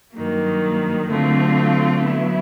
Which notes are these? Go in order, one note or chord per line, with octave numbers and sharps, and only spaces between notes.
G2 D#3 F#3 A#3
D3 F#3 A3 C4 F4
F#3 B3 E4